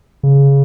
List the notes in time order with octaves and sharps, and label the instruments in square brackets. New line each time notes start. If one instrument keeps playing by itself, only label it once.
[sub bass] C#3